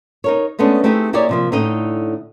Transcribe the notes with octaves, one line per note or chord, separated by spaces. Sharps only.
D#4 A#4 C#5
G#3 A3 B3 C#4 D4
A3 C4 D#4 E4 G4 G#4
A#3 E4 G4 G#4 C#5 D5
C3 F3 A#3
A2 D3 D#4 D#5 G5